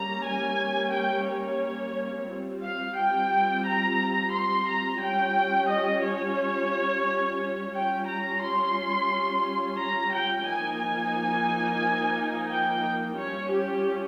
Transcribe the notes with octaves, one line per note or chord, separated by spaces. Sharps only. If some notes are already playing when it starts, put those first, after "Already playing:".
Already playing: G3 A#3 C#4 A#5
G#5
G5
C#5
G3 C4 F4
F5
G5
A#5
C6
A#5
G3 C#4 F4 G5
D#5
C#5
G3 C#4 F4 G5
A#5
C6
A#5
G5
F3 A#3 D#4 G#5
G#5
G5
G3 C#4 F4 C#5
G4